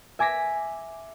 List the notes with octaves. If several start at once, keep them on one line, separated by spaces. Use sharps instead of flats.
E5 G#5 D6 A#6 B6